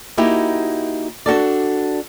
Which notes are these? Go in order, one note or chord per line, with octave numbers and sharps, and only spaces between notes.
A#3 D#4 E4 F#4 G4
D4 F#4 A4 D5